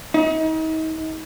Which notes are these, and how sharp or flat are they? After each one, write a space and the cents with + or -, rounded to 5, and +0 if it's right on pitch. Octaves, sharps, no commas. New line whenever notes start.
D#4 +35